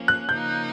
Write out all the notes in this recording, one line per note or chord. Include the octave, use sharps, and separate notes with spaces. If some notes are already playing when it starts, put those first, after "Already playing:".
Already playing: F3 A#3 C#4
F#6
C#3 F3 A#3 D#4 G6